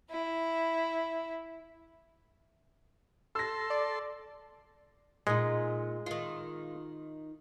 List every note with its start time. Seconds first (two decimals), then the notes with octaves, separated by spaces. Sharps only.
0.11 E4 E5
3.35 A4 C6 E6 A#6
3.70 D5
5.27 A#2 G#3 D#4
6.06 D#3 F4